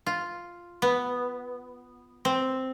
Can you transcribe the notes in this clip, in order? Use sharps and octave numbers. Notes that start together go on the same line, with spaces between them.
F4
B3
C4